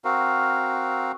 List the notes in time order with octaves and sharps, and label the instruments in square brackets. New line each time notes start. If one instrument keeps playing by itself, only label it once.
[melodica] C4 F#4 A#4 F5